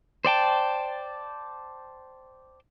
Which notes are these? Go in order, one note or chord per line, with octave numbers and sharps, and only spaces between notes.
C5 D5 G5 A5